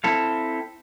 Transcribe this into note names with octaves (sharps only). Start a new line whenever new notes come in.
C4 E4 A4 F5